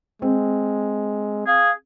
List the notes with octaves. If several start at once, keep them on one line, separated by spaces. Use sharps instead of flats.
G#3 C4
G#4 F5